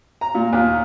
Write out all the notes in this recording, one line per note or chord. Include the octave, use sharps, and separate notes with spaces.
A#5
A#2
D#2